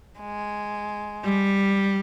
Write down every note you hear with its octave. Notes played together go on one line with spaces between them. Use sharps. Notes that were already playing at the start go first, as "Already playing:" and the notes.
G#3
G3